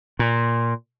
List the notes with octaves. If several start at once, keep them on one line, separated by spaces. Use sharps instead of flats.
A#2